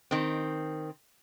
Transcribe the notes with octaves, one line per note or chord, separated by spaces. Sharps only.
D#3 C4